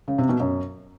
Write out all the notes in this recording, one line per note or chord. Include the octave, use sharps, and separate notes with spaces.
C#3
C3
B2
F#2